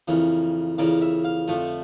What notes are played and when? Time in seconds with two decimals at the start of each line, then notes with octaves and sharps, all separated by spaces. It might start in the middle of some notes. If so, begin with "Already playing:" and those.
0.08 F2 C#3 E3 A#3
0.78 F2 C#3 E3 A#3 D5
1.01 E5
1.24 F5
1.48 F2 D3 F3 A3